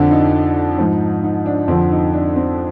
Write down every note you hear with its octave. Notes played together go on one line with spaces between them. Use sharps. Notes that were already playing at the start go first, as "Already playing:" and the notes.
Already playing: F2 D3 F3 D4
D#4
G#2 F3
D#4
D4
F2 D3 F3 C4
D#4
D4
C4